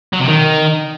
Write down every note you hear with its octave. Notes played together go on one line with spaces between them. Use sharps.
F#3
C3
D#3